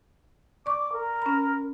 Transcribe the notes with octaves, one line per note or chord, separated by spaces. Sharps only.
D5 C#6 D6
A#4
C#4 B5